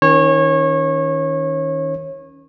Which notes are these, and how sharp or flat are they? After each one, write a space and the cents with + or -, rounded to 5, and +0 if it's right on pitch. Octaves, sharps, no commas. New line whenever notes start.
D#3 +30 C#4 +0 C#5 -25